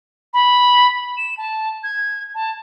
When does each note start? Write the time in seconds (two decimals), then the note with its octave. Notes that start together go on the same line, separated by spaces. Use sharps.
0.34 B5
1.17 E7
1.37 A5
1.83 G#6
2.35 A5